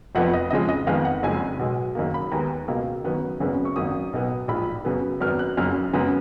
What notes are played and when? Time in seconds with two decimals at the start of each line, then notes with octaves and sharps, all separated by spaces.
0.15 F1 F2 F3 B3 F#5
0.33 D#5
0.50 F2 C#3 F3 G#3 D#5
0.69 D#5
0.87 F2 D#3 G#3 B3 F5
1.05 F#5
1.23 F#1 F2 C#3 G#3 G#5
1.59 B1 B2 G#3
1.95 F#1 F#2 D#3 A#3
2.14 B5
2.31 D#2 D#3 G#3 B3 A#5
2.68 C#2 B2 A#3
3.04 F#1 F#2 D#3 F#3 B3
3.40 G#1 F#2 C#3 G#3 B3
3.65 C#6
3.76 G#1 F#2 D#3 A#3 D#6
4.13 B1 B2 F#3 B3
4.48 A#1 G#2 F3 B5
4.85 F#2 C#3 F#3 B3
5.21 G#1 F#2 D#3 F#3 B3 F6
5.39 F#6
5.57 F#1 F#2 C#3 F6
5.93 F#2 C#3 G#3 B3